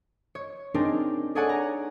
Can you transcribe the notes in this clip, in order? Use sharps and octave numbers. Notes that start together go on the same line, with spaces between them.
C#5
C4 D4 D#4 G#4 A#4
G#4 A4 C#5 D5 F#5 G#5
A#5